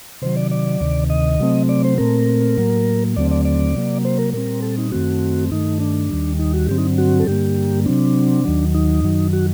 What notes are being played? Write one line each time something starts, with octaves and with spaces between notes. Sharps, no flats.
C3 D#3 F#3 C5
D5
D5
D2 C3 D#3
D#5
C3 F#3 A3 C4
D5
C5
A#2 A3 C4 A#4
A2 F#3 A#3
D#2 D3 F#3 A3 C4 D5
D5
D5
C3 F#3 A#3
C5
A#4
A#2 G3 C4 A#4
A4
D#4
F#2 D#3 A3 C4 F#4
G2 D#3 A3 D#4
D4
D#2 D#3 G3
D#4
F#4
G2 D3 F#3 C4 G4
D#4
F#4
A4
G2 D3 G3 A#3 G4
C3 F#3 C4 D4
D#2 D#3 F#3
D#4
F#2 D#3 F#3
F#4